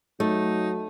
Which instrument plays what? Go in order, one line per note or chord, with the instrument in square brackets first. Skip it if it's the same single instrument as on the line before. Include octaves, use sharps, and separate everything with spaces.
[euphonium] F#3 [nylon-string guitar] A3 [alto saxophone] D#4